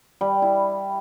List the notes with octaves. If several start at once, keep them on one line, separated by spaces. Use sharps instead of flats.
G3
E4